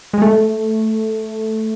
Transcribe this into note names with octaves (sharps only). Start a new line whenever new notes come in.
G#3
A3